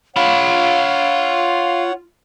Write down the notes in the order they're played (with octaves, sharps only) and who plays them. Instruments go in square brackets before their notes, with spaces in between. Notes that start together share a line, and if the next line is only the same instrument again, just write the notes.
[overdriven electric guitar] F4 B5 [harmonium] C#5 F#5 [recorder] F5